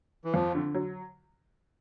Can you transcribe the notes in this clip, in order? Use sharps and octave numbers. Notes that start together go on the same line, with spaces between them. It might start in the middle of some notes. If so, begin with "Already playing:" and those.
E3
F2 F3
D3
F#3